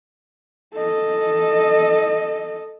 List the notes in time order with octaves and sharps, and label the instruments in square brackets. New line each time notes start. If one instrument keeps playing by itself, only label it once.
[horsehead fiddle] A4 D#5